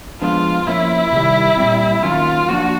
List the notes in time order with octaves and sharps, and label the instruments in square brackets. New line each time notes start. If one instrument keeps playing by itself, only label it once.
[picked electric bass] F3 G#3 B3 D4 [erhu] F4
[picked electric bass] F3 A#3 C#4 [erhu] E4
[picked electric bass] C3 D#3 G3
A#2 G3 C4
[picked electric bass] D#3 F#3 A#3 C#4 [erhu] F4
[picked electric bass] F3 A#3 D4 [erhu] F#4